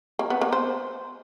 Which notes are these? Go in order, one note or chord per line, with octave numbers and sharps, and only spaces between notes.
A#3
B3
A#3
C5